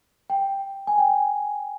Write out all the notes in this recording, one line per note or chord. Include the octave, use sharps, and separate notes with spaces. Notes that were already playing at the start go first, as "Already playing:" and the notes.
G5
G#5
G5